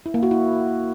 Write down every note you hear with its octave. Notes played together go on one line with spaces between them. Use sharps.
E4
A#3
F#4
E4